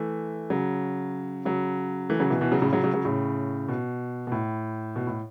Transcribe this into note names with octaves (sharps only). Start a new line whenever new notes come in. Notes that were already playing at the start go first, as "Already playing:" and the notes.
Already playing: E3 A3
C#3 F#3
C#3 F#3
E3 A3
C#3 F#3
B2 E3
B2 E3
C#3 F#3
A2 C#3
C#3 F#3
C#3 F#3
C#3 F#3
A2 C#3
B2
B2
A2
B2
A2